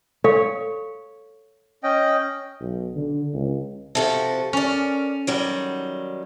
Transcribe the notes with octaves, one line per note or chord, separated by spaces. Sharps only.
A4 C#5 F5
C#4 D#5 G5
B1
D3
C#2
C3 F3 F#4 A4
C#4 A#4 D5
D#3 F#3 G3